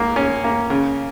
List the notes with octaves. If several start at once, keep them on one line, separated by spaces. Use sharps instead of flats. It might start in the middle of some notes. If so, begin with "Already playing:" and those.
Already playing: C#2 A#3
C#4
A#3
C#3